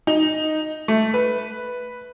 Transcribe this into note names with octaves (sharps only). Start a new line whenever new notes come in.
D#4
A3
B4